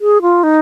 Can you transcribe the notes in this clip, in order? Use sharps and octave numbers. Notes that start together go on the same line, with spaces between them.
G#4
F4
D#4